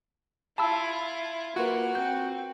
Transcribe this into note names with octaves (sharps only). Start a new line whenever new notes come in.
E4 F4 A5 B5 E6
A#3 F4 F#4 B4
C4 G6